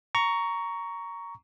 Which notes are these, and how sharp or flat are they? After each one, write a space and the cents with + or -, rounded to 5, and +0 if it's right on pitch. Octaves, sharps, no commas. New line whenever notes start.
A#5 +0 C#6 +15